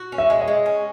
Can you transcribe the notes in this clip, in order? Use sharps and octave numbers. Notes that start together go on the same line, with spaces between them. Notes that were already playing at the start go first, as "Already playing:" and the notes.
Already playing: F#4
C#4
E5
G#3
D#5
G#3
C#4